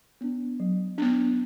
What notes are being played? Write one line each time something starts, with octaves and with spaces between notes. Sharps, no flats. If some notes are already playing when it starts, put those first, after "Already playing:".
B3 D4
F#3
B3 D4